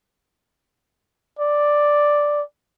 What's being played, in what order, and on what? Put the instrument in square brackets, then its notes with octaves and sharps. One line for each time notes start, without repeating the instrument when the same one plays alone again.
[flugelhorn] D5